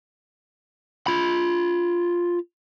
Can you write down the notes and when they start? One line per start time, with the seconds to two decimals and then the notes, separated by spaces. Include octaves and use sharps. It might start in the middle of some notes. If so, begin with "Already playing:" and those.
1.07 F4 B5